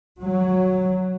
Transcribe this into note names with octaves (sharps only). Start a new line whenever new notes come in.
F#3